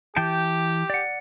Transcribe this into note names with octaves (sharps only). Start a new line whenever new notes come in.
E3 G4 G5 A5
D5 F#5